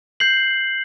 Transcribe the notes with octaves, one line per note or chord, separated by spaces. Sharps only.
G6 C7 F#7